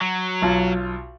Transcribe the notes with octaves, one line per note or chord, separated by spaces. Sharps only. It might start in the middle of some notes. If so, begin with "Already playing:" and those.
F#3
B1 F4 A5